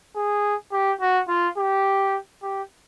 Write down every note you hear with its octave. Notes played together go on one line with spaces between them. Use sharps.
G#4
G4
F#4
F4
G4
G4